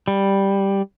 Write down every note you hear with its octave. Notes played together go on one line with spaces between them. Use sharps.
G3